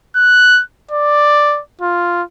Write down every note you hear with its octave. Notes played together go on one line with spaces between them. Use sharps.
F#6
D5
F4